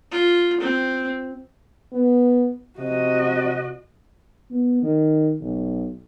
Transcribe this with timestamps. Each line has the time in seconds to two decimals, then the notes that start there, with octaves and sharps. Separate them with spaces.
0.12 F4
0.61 C4
1.93 B3
2.79 C3 F#4 D#5
4.51 B3
4.82 D#3
5.40 B1